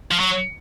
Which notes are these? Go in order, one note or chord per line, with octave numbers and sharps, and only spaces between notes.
F3
F#3